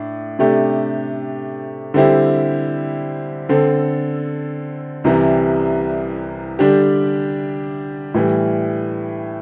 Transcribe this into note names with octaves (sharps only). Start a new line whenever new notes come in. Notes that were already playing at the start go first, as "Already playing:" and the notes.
Already playing: A2 D4
C3 A3 D4 G4
D3 G3 C4 E4 G4
D3 C4 A4
C2 C3 E3 G3
D3 G3 D4 G4
A2 E3 G3